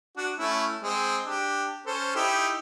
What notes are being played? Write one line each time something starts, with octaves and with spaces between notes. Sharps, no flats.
D4 F#4
A3 C#4 E4
G#3 C4
D4 G4
C#4 A4 C5
D#4 E4 G4